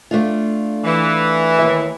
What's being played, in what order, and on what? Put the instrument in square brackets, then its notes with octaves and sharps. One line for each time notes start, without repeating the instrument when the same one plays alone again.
[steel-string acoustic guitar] A3 D4 F4
[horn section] E3
[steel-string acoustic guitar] D#2 E5